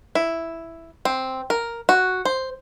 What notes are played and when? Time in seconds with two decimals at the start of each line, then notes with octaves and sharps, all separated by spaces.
0.15 E4
1.05 C4
1.50 A#4
1.89 F#4
2.25 C5